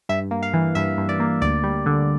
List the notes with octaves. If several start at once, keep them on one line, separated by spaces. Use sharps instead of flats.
G2 E5
A#3
F5
E3
G2 E5
G2
D5
A#3
D2 D5
G3
D3